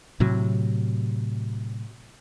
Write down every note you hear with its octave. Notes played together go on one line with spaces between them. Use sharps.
A2 C3 F#3